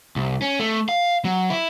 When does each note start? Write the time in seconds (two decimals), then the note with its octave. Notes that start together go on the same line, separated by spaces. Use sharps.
0.16 C2
0.42 C#4
0.59 A3
0.89 F5
1.25 F#3
1.50 E4